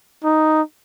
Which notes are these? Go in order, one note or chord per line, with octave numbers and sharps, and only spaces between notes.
D#4